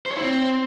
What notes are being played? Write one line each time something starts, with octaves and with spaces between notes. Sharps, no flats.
C5
C#5
E4
C4